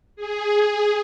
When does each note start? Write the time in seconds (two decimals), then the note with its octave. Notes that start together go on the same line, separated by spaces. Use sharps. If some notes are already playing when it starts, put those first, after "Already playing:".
0.16 G#4